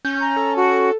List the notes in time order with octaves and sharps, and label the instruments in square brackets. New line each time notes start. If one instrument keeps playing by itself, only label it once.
[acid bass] C#4 [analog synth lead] G6
[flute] A#5
[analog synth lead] A4
[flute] F#4